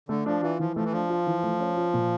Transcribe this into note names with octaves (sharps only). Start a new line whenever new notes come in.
D3 A3
F3 D4
E3 F4
E3 F3
F3 A3
E3
F3 D4
F4
E3
A3
C#4
F4
A#2